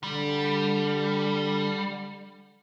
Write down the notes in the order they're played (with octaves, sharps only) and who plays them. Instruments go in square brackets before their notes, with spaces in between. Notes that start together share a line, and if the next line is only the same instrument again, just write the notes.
[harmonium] D3 [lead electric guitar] G3